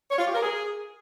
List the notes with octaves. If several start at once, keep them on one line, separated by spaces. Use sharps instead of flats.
C#5
F4
G4
A#4
G#4